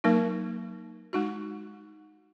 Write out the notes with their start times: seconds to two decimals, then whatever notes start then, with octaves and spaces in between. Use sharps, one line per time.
0.04 F#3 A#3 D#4 A#4
1.13 G#3 D#4 F#4